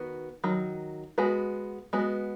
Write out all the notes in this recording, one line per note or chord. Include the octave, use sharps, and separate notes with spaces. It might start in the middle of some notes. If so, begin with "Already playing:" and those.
Already playing: D#3 B3 F#4
D#3 F#3
G#3 B3 F#4 B4
G#3 B3 F#4 B4